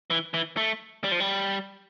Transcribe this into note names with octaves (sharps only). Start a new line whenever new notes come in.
E3
E3
A3
G3
F3
G3